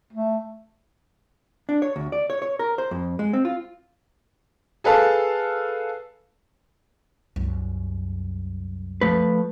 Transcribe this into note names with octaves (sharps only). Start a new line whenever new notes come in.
A3
D4
C#5
D2
D5
C#5
C#5
A#4
C5
F2
G#3
C4
F4
G#4 A4 B4 F5 A5
C2 F#2
F3 A3 B4